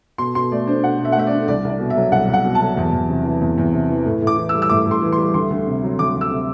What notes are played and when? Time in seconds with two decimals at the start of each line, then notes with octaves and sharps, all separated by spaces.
0.18 B2 C6
0.35 B2 C6
0.52 A3 D5
0.67 D4 C5
0.83 B2 F#5
0.99 B2
1.05 E5
1.12 F#5
1.16 A3 E5
1.27 D4 D5
1.48 C2 D5
1.64 C2 D5
1.80 B2
1.90 E5
1.97 F#3
2.12 C2 F#5
2.28 C2
2.33 F#5
2.44 B2
2.55 A5
2.61 F#3
2.77 E2
2.93 E2
3.09 C3
3.25 E3
3.42 E2
3.58 E2
3.74 C3
3.90 E3
4.05 A2
4.22 A2
4.27 D6
4.38 E3
4.49 E6
4.54 G3
4.62 E6
4.70 A2 D6
4.86 A2
4.91 C6
5.02 E3
5.13 C6
5.18 G3
5.34 D2 C6
5.50 D2
5.67 C3
5.83 F#3
5.99 D2 D6
6.16 D2
6.21 E6
6.31 C3